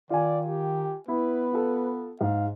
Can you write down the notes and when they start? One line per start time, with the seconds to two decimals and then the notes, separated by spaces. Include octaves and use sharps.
0.10 D#3 F4 D5 G#5
0.47 G4
1.08 B3 E4 B4
1.52 F4 A4
2.21 G#2 F5